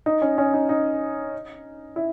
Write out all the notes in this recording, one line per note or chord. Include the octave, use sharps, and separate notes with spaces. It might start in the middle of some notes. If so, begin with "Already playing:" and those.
D#4
C#4
C#4
D#4
D#4
E4